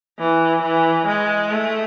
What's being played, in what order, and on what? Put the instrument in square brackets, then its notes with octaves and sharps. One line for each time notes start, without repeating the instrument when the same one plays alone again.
[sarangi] E3
E3
G#3
A3